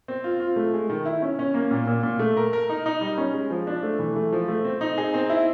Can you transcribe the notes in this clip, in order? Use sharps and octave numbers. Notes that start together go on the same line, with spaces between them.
C4
F4
F4
A3
G#3
D#3
E4
C#4
C#4
A#3
A#2
A#2
A#2
A3
A#4
A#4
D#4
D#4
G3
C#4
G#3
F3
D4
A3
E3
A3
F3
A3
C4
D#4
G#4
C4
E4